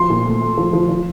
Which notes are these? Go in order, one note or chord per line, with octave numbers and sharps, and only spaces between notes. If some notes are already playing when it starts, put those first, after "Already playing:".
Already playing: F3 C6
A#2
A3
A3
F3
F3
F3